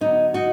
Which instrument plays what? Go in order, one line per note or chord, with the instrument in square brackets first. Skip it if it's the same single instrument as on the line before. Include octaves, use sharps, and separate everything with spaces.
[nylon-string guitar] D3 F#3 B3 D#4
D#4 F#4